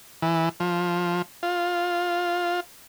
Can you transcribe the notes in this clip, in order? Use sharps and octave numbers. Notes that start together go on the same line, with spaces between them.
E3
F3
F4